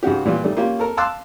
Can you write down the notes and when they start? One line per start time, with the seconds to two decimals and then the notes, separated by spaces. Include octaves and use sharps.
0.03 C#2 G#2 F#4 G4
0.26 A#2 E3 G3 F4
0.44 D#3 G3 A3
0.57 A#3 C#4 F4 G4
0.79 A4 A#4
0.97 F5 A5 C6 D6 E6 F#6